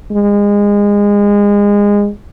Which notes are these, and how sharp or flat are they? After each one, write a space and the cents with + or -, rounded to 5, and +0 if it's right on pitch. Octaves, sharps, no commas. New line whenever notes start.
G#3 -25